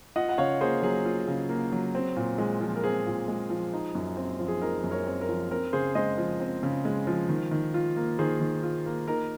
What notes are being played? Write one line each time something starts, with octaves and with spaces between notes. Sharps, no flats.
F4 D#5 F#5
F#5
C#3 C#5 F5
A#3 G#4 C5
F#3 G#4
F4
C#3
A#3
F#3
C4
A#2
G#3
F3
A#4
C4 G#4
A#2
G#3
F3
D#4
F#2
C4
F3
G#4
D#4 A#4
F#2
A#4 C#5
C4
A#4
F3
C4 A#4
C#3 G#4 C5
G#3 C5 D#5
F3
C4
C#3
G#3
F3
D#3
D#3
F4
A#3
D#3 G#4 C5
D#3
F4
A#3
D#4 A#4